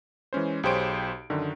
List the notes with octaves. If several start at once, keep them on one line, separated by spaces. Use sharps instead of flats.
E3 G#3 C#4 C5
B1 G4 G#4 C5 C#5 D7
F#2 D3 D#3